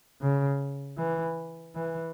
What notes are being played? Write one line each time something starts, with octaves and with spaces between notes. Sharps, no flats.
C#3
E3
E3